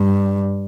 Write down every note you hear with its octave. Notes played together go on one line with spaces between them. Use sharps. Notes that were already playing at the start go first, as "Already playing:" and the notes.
Already playing: G2